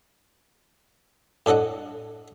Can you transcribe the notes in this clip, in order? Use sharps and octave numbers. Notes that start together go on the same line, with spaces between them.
A2 D4 A4 D#5 F#5